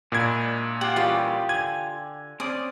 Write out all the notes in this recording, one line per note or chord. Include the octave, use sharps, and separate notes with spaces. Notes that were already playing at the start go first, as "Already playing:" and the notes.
A#2 G#3 D4 E4 G#6
F4 G4 F#5
E3 G3 C#4 F4 G4 D#6
D3 G#5 G#6
C4 C#4 D5 D#6